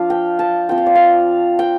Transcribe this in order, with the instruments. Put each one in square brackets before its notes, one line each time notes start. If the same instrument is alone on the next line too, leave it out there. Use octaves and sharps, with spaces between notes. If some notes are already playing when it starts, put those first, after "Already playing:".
Already playing: [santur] F3 D4 F4 F5
G5
A5
F3 C4 F4 G5
F5
D5
F5
G5